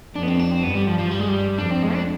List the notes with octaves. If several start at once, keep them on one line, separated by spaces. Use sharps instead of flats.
F2 D4
B3
C4
D4
C4
G2 B3
G3
F3
F3
G3
G#3
G3
F2 D4
C4
G#3
D4